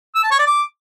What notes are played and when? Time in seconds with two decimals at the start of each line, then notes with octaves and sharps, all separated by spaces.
0.16 E6
0.23 A5
0.31 C#5
0.39 D5
0.47 D6